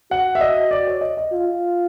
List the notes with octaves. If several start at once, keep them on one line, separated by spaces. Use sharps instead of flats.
F#4 F#5
E5
D#5
D5
C#5
D#5
D#5
F4